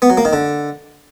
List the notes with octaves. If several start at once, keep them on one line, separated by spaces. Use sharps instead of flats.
B3
F#3
A#3
D#3
D3